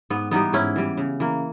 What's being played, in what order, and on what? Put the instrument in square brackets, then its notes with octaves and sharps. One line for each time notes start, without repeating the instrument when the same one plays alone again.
[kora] G#2 B3
E3 G3 B3 D#4
G#2 C#4 E4
E3 G3
C#3
E3 A#3